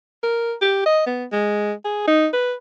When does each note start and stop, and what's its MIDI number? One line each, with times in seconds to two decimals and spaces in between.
0.23 0.54 70
0.61 0.83 67
0.85 1.02 75
1.07 1.25 59
1.32 1.73 56
1.85 2.05 68
2.07 2.27 63
2.33 2.54 71